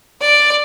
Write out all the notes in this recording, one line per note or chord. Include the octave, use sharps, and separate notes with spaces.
D5